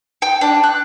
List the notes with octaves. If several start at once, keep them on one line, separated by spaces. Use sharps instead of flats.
G5
D4
F#6